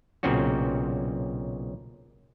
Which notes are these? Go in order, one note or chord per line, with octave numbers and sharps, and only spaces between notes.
B1 A#2 C#3 C4 C#4 F#4